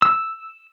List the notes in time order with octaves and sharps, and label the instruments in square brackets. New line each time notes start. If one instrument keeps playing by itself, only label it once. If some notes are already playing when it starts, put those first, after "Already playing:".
[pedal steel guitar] E6